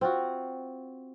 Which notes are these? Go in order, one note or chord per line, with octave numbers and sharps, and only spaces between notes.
C4 F4 F#4